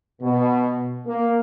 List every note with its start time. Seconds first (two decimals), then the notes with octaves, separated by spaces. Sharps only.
0.21 B2
1.07 A#3